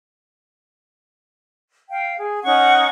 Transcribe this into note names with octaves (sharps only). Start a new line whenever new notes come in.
F5 G5
G#4
C#4 D#4 F#5 C#6